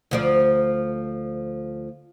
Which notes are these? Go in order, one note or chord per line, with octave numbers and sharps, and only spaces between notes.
D2 F3 D5